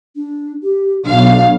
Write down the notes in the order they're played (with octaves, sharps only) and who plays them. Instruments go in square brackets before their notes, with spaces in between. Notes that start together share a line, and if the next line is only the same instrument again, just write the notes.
[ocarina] D4
G4
[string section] B1 F5 [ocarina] D4